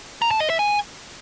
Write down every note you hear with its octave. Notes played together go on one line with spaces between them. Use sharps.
A#5
A5
D#5
E5
G#5